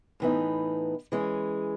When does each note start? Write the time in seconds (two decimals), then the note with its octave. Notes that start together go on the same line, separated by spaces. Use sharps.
0.20 A2 E3 B3 D#4
1.12 E3 G#3 C#4